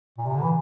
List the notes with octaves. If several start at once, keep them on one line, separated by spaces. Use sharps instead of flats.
A#2
C3
D3
E3